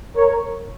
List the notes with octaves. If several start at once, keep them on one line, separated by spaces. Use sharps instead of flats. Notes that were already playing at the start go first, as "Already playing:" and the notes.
A#4 C#5